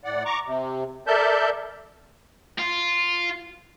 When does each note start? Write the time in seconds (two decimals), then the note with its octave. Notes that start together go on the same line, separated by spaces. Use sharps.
0.04 A2 D5 F#5
0.25 A#5 C#6 D6
0.46 C3
1.07 A4 A#4 D5 E5 A5 G6
2.58 F4